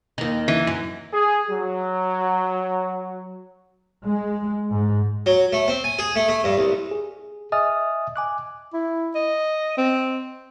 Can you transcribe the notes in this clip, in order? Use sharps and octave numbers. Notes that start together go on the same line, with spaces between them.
D#2 D#3
E3
F#2
G#4
F#3
G#3
G#2
F#3
A3
C4
G#5
G#4
A3
A3
G2
C2
G#4
D#5 E5 G#5 D#6 F6 A6
G#5 D6 F#6
E4
D#5
C4